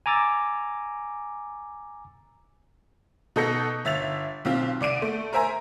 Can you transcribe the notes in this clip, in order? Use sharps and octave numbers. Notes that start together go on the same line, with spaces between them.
G#5 A#5 D6 E6 A6
B2 D#4 A4 G6 A#6 C#7
G1 E5 A6 F7
B1 C4 F4
C2 D5 D7 D#7
A3
A#4 C5 E5 G#5 A#5